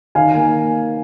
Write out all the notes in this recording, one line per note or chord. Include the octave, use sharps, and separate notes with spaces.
D#3 F5 G#5
A#3